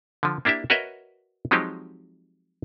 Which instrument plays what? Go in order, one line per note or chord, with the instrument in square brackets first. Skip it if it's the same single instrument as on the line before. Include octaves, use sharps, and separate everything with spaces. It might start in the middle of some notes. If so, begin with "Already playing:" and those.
[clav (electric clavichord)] D3 F3
A#3 D4 E4 G4 E5
F#4 A#4 B4 C#5 D#5 E5
F3 F#3 G#3 C4 D#4 G4